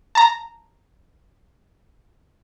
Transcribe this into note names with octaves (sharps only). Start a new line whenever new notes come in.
A5 A#5